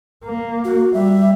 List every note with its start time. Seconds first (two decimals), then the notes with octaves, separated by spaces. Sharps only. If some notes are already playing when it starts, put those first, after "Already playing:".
0.24 A#3
0.64 F#4
0.94 G3 E5